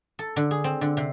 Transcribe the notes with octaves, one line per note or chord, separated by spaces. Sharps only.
A4
D3
G#4
C4
D3
C3